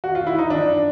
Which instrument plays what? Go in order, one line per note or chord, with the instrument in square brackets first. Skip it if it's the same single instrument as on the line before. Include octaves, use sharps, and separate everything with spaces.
[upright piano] F#4
F4
E4
D#4
F#2 D4